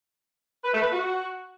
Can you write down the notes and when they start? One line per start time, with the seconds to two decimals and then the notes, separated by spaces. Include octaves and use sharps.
0.63 B4
0.73 A3
0.82 B4
0.91 F#4